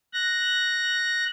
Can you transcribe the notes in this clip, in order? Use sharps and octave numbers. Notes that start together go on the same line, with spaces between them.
F#6 A#6